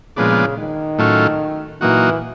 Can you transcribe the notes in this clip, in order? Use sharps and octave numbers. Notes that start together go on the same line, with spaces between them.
A#2 C#3 F3 G#3 B3 D4
D#3
A2 F#3 A3 C#4 F4
A#2 E3 F#3 A#3 D#4 F#4